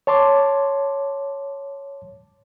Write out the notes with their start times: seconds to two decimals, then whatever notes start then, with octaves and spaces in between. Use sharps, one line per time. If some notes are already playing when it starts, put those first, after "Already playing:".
0.07 C#5 A5 C6 D6